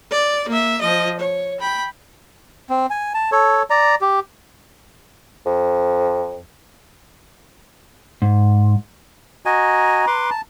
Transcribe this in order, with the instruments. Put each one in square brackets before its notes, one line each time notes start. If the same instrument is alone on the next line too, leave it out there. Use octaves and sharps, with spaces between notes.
[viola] D5
A#3 E5
F3 D#5
C#5
G5 B5
[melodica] C4
G#5
A5
A4 C#5
D5 A#5
G4
[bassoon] F2
[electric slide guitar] G#2
[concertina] F#4 D#5 G#5 [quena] A#5
[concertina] B4 C6 D6
A5